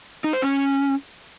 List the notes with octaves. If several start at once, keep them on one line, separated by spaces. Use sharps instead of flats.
D#4
C5
C#4